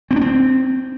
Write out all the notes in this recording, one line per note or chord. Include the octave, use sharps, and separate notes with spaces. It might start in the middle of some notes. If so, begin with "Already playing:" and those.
C4
D4
C4